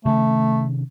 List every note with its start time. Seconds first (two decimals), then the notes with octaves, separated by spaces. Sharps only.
0.05 C3 D#3 A3 C#4